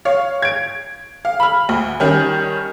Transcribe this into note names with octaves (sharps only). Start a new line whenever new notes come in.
C#5 F5
G#6 D7
F5
B5 F6
D2
D#3 G3 C#4